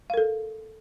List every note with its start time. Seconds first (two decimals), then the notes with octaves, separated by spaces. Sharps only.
0.10 F5
0.14 A#4
0.17 A4